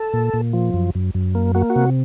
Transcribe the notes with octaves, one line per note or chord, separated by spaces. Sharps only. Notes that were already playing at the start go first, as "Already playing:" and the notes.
Already playing: A4
A#2
A#2
F3
F#2
F#2
F#2
A#3
A#3 F#4
F#4
C3